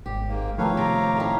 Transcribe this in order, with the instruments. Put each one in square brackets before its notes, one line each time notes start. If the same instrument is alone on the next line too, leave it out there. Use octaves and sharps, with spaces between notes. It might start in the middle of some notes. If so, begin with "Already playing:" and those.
[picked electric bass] G#1 [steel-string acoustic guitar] G4
[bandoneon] G#2 A#3
[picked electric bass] D#3 F3 A3 [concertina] A#3 C4 B4 [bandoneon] C#5 F5
[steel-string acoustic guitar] C3 C4 [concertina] A#5 D6
[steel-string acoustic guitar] A2 G3 D#4